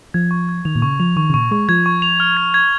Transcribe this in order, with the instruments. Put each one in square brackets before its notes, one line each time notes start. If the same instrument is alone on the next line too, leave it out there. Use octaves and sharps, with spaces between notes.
[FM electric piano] F3 [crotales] G#6
[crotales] C#6
G#6
[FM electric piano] D#3 [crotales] F7
[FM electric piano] A#2
[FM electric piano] C#3 [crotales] C#6
[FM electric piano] F3 [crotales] F7
[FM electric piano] D#3 [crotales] C#6
[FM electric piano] C#3
[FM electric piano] A#2 [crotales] C#6
[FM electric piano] G#3 [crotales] C#6
[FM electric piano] F3 [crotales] G#6
[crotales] C#6
F7
F6
G#6
G#6